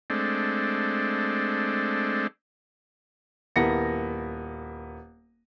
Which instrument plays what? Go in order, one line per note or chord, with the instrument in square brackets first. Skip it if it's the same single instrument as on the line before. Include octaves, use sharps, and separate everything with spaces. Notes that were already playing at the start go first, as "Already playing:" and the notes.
[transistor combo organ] G#3 A3 C4 D4
[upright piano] D#1 A#3 B3 E4 A#6 C#7